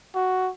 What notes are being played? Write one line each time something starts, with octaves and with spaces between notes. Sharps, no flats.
F#4